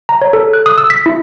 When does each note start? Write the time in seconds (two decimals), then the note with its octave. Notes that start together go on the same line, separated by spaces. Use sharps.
0.09 A#5
0.22 C#5
0.33 A4
0.53 F#6
0.66 D#6
0.78 E6
0.90 B6
1.06 E4